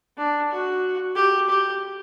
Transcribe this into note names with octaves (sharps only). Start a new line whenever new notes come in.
D4
F#4
G4
G4